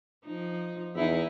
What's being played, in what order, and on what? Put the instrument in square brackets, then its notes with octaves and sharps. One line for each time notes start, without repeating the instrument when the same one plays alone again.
[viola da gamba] F3 D#4
[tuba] E2 [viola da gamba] D#4 E4